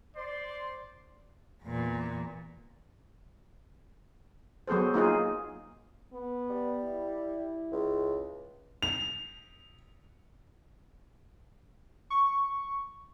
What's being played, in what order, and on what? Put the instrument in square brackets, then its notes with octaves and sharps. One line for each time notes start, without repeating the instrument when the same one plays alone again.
[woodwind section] C5 C6 [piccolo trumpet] D5
[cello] E2 A#2
[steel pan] F#3 B3 G#4 A4 C5
A#3 D#4 F4 G#4
[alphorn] B3
[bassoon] G3
[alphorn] E4
[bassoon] C#2
[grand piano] F7
[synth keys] C#6